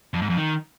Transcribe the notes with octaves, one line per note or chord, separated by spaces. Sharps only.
F2
G#2
F2
D#3